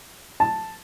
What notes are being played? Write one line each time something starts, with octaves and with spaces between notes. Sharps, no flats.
A5